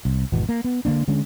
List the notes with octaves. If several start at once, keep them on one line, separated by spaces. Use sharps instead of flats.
C2
G#1 E2 B2
A#3
B3
D3 A#3 D4
D3 G#3 C#4